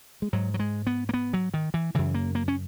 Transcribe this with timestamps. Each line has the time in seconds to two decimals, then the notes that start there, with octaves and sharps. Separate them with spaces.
0.22 G#3
0.33 G#2 F#3
0.54 F#3
0.59 G#3
0.87 B3
1.09 A#3
1.14 B3
1.34 F#3
1.54 D#3
1.74 E3
1.94 F#2 C#3 E3
2.14 A#3
2.35 A#3
2.48 C#4